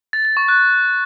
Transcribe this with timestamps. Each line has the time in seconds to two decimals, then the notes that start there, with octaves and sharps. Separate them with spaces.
0.13 A6
0.25 A6
0.37 C#6
0.48 F#6